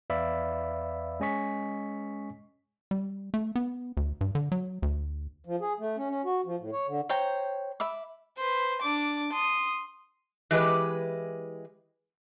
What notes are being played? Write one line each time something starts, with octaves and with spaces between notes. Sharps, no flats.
E2 B4 D5 E5 F5 B5
G#3 C#4 D#5 G#5 C#6 B6
G3
A3
B3
D2
G2
D3
F#3
D2
F3
G#4
A3
C#4
C#4
F#4
F3
A2
C#5
D3
C5 C#5 G5 A#5
E5 B5 D6
B4 C5
D4 D6
C6 D#6
E3 G#3 G4 B4